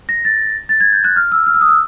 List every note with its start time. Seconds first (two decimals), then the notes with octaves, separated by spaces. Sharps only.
0.09 A#6
0.25 A6
0.69 A6
0.80 G#6
0.93 G6
1.04 F#6
1.16 F6
1.32 E6
1.47 F6
1.54 E6
1.61 D#6
1.68 E6